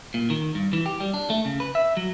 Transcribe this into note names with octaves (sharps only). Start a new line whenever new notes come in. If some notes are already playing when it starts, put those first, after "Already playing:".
A#2
D#3
G2
E3
G4
G3
D4
A3
C#3
B4
E5
F#3